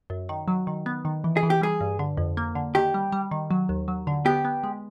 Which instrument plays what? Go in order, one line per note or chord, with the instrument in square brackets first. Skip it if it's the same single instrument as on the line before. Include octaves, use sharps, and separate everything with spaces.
[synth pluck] F#2
D#3
F#3
D#3
B3
D#3
E3
[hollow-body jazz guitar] G#4
[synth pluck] E3
[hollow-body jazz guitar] G4
[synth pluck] G3 [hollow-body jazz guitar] G#4
[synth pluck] G2
D3
F2
A#3
D3
[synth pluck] D#3 [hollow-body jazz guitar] G4
[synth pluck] G3
G3
D#3
F#3
D#2
F#3
D3
[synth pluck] B3 [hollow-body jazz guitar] G4
[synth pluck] B3
G#3